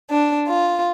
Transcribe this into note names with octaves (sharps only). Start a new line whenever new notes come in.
D4
F4